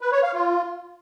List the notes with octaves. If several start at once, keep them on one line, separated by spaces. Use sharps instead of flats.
B4
C#5
F5
F4